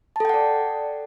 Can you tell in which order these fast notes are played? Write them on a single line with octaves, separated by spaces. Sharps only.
A5 A4 G5 F#5 D5